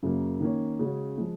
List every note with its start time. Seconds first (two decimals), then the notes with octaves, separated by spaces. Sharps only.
0.03 F#2 C#3 F#3 A#3
0.40 D#3 A#3 C#4
0.79 C#3 G#3 C#4 F#4
1.18 F3 G#3